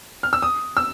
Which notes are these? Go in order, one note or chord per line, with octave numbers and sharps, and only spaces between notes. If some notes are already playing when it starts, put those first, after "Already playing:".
F6
E6
D#6
E6